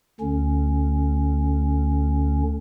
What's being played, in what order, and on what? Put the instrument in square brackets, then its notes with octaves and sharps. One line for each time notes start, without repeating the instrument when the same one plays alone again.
[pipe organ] D2 D3 C#4